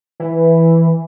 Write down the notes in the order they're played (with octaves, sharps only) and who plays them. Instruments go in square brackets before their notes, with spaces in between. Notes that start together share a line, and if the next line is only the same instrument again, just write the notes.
[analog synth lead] E3